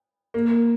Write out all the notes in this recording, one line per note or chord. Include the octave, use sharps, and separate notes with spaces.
A#3